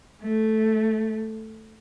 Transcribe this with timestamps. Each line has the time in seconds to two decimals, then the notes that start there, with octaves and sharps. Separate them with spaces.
0.22 A3